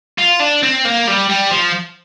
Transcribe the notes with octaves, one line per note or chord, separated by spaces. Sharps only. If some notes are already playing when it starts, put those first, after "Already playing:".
F4
D4
C4
A#3
G3
G3
F3